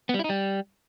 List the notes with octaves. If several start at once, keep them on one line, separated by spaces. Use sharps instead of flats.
B3
G3
E4
D#4
G3